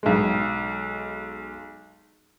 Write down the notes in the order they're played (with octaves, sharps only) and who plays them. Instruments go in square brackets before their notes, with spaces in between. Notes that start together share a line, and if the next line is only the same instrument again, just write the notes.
[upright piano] B1 G#3